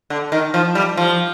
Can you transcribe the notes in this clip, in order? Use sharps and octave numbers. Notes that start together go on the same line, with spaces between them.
D3
D#3
F3
G3
F3